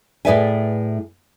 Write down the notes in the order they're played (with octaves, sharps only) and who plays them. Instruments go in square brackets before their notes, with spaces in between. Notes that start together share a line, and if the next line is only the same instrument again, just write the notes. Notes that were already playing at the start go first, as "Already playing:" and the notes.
[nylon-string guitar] A2 G#4 B4 D5 E5 G#5